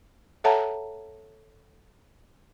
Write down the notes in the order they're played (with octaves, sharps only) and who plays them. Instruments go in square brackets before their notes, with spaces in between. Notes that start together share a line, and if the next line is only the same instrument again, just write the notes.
[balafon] A4 C#5 E5 F#5 A5 A#5